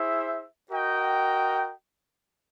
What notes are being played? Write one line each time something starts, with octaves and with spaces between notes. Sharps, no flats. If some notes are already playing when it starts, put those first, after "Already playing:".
Already playing: E4 G#4 C5 E5
F#4 A#4 D#5 G5